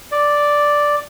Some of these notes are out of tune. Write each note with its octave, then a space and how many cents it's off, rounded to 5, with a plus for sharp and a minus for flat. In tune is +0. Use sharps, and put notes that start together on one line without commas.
D5 +0